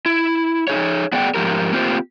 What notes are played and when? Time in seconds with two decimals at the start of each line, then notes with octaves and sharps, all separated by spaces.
0.06 E4
0.68 D#4 G#4 C#5
1.12 B3 D4 G#4 D5 F#5 G5
1.34 G#2 F3 G4 A#4
1.73 A#3 C4 F4 G4 C5